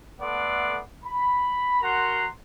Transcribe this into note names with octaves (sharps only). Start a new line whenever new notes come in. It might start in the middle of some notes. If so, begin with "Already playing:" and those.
A3 B3 A4 D5 F#5 C6
B5
F#4 A#4 F#5 A#5 C6